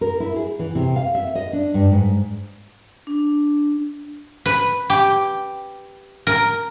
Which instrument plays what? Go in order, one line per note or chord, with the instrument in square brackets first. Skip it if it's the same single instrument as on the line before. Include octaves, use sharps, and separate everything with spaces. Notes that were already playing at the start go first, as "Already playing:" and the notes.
[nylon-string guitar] A#4
E4
G#4
E3
C3
F5
E5
D#5
D4
G2
G#2
[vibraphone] D4
[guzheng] B4
G4
A#4